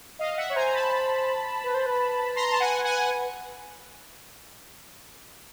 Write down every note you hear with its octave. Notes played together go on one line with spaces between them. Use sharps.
D#5 F5
E5 F#5
C#5
C5 G#5 A#5
A#5
A5 B5
B4
C5
B4
A#5 C6
A5
F#5 G#5
F#5 G#5